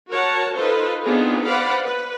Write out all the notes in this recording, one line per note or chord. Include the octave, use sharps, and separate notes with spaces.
F#4 A#4 C#5 F#5 A5
D#4 F4 A4 B4 C5
B3 C4 D4 D#4 F4 G#4
B4 C5 D5 F5 F#5 B5
B4